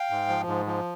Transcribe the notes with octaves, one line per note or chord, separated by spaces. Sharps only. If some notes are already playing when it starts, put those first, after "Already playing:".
Already playing: F5 G5
G#2
F3
G#2
F3